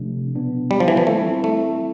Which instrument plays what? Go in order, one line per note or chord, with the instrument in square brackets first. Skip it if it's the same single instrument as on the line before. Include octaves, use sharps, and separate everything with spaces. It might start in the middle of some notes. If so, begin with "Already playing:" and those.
Already playing: [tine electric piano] C3 F3 A3 D4
B2 B3 D4
[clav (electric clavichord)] G3
F3
E3
F3
[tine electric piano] E3 G3 C4 E4 [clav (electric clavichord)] A3
[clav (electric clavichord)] A3